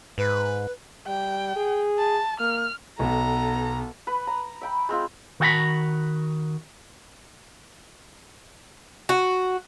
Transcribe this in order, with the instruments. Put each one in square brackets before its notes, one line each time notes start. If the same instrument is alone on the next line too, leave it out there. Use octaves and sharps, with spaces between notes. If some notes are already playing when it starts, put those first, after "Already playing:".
[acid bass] G#2 [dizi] B4
[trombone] G3 [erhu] G5
[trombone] G#4
[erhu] A5
[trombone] A#3 [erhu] F6
[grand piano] B1 [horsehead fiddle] B3 A4 [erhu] A#5
[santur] B4
A#5
E5 G5 B5
G#3 C4 F4
[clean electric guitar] D#3 F#4 F#5 A#5 B5
[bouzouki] F#4